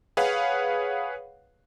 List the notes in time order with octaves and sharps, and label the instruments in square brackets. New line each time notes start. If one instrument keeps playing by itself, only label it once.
[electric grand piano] G#4 B4 C#5 F5 F#5